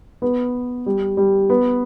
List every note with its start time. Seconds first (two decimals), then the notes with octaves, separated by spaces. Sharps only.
0.22 B3
0.86 G3
1.17 G3
1.50 B3